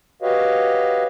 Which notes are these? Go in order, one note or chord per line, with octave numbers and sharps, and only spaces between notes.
F#4 G4 B4 C#5 D#5 F5